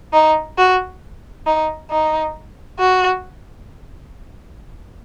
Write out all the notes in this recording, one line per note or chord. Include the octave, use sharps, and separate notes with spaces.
D#4
F#4
D#4
D#4
F#4